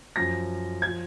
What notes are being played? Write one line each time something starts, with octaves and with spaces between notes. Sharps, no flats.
F#2 F3 A#6
F3 G#6